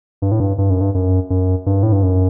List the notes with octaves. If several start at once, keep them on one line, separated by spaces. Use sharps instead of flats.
G2
A2
G2
G2
F#2
G2
F#2
F#2
G2
A2
G2
F#2